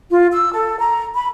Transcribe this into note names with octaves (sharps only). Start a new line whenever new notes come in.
F4
E6
A4
A#5
B5